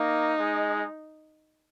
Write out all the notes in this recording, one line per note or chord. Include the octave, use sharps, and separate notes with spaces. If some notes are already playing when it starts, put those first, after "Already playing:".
Already playing: A#3 D#4
G#3